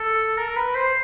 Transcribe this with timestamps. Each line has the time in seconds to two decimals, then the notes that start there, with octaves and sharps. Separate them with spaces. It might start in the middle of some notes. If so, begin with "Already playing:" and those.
Already playing: A4
0.37 A#4
0.56 B4
0.75 C5